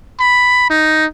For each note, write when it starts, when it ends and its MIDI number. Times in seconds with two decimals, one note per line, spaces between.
0.20 0.68 83
0.70 1.06 63